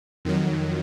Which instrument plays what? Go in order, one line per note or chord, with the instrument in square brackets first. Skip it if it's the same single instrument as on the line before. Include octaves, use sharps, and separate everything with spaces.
[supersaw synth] F2 D#3 F#3